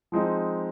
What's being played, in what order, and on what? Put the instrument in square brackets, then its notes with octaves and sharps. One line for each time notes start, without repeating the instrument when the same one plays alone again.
[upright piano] F3 G#3 C4 D#4